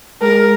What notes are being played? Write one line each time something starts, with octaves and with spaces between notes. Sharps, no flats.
G#3 A#4